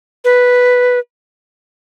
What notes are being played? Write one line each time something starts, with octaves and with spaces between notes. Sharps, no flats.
B4